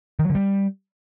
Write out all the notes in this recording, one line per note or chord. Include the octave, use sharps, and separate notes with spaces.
D#3
F#3
D3
G3